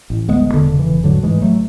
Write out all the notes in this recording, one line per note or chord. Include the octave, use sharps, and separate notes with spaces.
A1
D2 G#3 B3
E1
D3
C#3
E3
E1
G#2 D3 F#3
G#2 E3 G#3
A1 F#3 A3